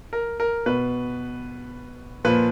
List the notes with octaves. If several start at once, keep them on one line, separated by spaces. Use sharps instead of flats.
A#4
A#4
B2 B4
A#2 F3 B4